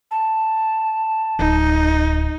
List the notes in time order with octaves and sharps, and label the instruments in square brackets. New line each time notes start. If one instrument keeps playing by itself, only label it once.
[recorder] A5
[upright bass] D1 [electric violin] D#4